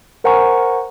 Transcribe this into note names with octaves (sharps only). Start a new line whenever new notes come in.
A#4 C5 F#5 G#5 A#5 C#6